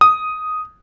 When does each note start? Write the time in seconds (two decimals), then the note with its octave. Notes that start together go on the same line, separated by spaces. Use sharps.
0.01 D#6